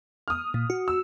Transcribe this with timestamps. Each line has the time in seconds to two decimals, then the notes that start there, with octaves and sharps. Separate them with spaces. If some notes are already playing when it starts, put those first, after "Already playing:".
0.28 D#6 F6
0.54 A#2
0.70 F#4
0.88 E6